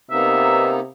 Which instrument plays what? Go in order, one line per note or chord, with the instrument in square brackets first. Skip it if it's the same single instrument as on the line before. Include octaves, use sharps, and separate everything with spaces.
[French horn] C3 [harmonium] A#3 B3 D#4 [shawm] E5